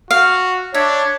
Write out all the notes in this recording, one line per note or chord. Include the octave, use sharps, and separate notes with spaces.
F#4 F5
D4 C#5 E5